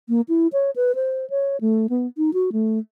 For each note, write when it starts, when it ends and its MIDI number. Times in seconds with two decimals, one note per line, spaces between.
0.09 0.21 58
0.29 0.47 64
0.53 0.71 73
0.76 0.95 71
0.95 1.29 72
1.30 1.60 73
1.61 1.87 57
1.89 2.07 59
2.17 2.31 63
2.34 2.50 66
2.52 2.79 57